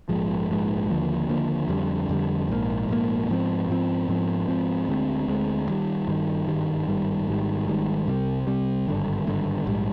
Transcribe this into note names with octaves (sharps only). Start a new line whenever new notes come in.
A#1 G#2 F3 G#3
A#1 G#2 F3 G#3
D#2 D3 F3 A#3
D#2 D3 F3 A#3
F2 D3 G3
F2 D3 G3
A#1 G#2 D#3 A#3
A#1 G#2 D#3 A#3
G#2 F3 C4
G#2 F3 C4
G#2 F3 C4
G#2 F3 C4
D2 D3 G#3 C4
D2 D3 G#3 C4
G2 D#3 G3
G2 D#3 G3
G#1 G2 D#3 G3
G#1 G2 D#3 G3
G#1 G#2 D#3 G3
G#1 G#2 D#3 G3
C2 C3 G3
C2 C3 G3
G#1 G2 D3
G#1 G2 D3
A#1 G#2 G3